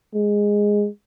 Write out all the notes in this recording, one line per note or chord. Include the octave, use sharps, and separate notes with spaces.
G#3